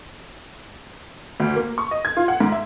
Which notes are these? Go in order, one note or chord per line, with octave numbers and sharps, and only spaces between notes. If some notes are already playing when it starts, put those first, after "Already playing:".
D2
A#3
C#6
D#5
G#6
F4
F#5
G#2
E5